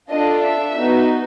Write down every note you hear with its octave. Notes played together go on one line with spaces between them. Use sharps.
D4 F4 A4 D#5
E5
B3 D#4 F#4